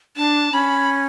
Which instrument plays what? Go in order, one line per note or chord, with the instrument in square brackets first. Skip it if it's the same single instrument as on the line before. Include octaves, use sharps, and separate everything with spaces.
[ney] D4 [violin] A5
[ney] C#4 [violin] B5